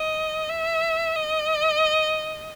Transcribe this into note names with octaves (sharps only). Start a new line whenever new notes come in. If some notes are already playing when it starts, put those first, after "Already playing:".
Already playing: D#5
E5
D#5